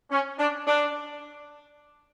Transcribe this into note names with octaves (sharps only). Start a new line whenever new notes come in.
C#4
D4
D4